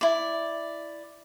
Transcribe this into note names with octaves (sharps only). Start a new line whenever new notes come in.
E4 D5